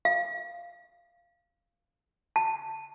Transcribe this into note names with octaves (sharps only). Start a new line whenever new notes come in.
F5
A5